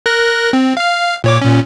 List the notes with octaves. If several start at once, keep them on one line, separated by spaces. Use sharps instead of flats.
A#4 F#6 A#6
C4
F5 F6
A#2 C#5 D6
A#2 C#4